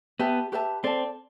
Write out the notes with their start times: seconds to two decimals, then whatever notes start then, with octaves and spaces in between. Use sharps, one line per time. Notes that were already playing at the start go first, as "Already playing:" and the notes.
0.19 B3 G4 B4 E5 A5
0.52 G4 B4 E5 A5
0.83 C4 A4 D5 A5